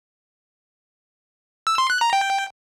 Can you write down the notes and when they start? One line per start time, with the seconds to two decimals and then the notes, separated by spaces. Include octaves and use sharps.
1.67 E6
1.78 C6
1.90 F#6
2.01 A#5
2.13 G5